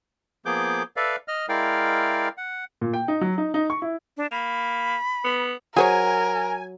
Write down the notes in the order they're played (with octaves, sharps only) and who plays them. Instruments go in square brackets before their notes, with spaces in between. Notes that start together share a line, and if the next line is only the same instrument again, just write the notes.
[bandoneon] F3 A#3 B3 G#4 D6 G6
A4 B4 D5 E5 F5
D#5 F6
G#3 E4 A#4 D5 F5 G5
F#5
[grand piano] A#2
G5
D#4
F#3
D#4
D#4
C#6
E4
[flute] D4
[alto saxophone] A#3 [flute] B5
[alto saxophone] B3
[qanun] F#3 [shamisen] G#4 C5 C#5 [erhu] A#4 [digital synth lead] G#5